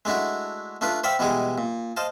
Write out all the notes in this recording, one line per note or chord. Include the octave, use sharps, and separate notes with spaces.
G#3 A3 D4 E4 F#4
A3 D4 F4 B4
C5 D5 E5 F5 G5 B5
B2 E3 G3 G#3 G#4
A#2
C5 D#5 F5 A5